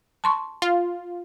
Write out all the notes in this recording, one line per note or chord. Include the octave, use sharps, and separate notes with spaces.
A5 C6 C#6
F4